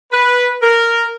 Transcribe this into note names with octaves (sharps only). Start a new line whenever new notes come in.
B4
A#4